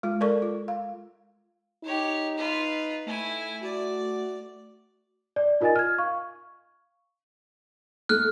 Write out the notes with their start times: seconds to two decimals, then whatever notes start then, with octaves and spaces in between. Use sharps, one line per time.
0.03 G#3 F4
0.21 A4 A#4 D5 C#6
0.42 F4
0.68 F5
1.84 D#4 G4 C#5
2.38 F4 B4
3.06 A3 E4 G#5
3.63 F#4 D5
5.36 D5
5.61 D#4 F4 A#4 D#5 G#5 A6
5.76 F6 G#6
5.98 F5 C#6
8.09 A3 F6 F#6